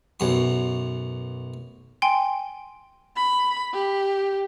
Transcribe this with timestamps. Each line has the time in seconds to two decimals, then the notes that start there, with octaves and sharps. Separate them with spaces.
0.20 B1 F#2 C6
2.02 G5 G#5 C6
3.16 B5
3.74 G4